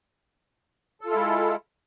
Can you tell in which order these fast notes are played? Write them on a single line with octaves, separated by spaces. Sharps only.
A4 F4 E4 G#3